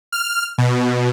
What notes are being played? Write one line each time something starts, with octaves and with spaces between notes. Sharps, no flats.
F6
B2